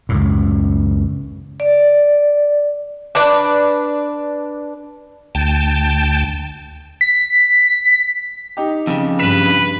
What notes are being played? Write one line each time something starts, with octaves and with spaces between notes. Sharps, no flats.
C#2 F#2 A2
D5
D4 B4
D2 G5 A5
B6
D#4 G4
F2 C#3
G2 B4 B6 E7